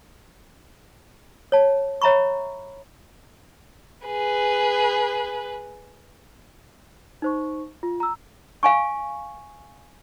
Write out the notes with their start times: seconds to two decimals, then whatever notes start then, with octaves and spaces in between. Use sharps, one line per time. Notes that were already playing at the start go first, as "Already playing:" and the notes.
1.52 C#5 A5
2.02 C#5 E5 A#5 B5 C#6
4.06 G#4 B4
7.22 D#4 C5 C#6
7.83 F4
8.00 A#5 E6
8.63 F5 G#5 C#6